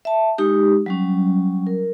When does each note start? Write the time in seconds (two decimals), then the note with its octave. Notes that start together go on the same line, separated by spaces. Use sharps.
0.05 E5 A5
0.38 G#3 D#4 G4
0.86 F#3 G3 C#4
1.67 A#4